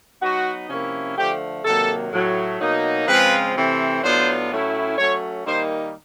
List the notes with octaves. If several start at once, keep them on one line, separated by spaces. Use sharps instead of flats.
F#3 B3 D#4 F#4
C3 F3 A#3 C#4 E4
D3 F3 A3 G4
C3 D#3 F#3 A#3 A4
A2 F#3 A3
B2 F#3 A#3 D#4
C#3 F3 G#3 C4 F4 B4
C3 E3 A3 C4
A2 F#3 B3 D4 F4 C5
A2 F#3 A3 C#4 E4
F#3 A3 C#4 C#5
D#3 G3 A#3 D#4 C5